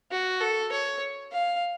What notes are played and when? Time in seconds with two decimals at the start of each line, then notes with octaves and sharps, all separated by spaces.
0.11 F#4
0.41 A4
0.72 C#5
1.32 F5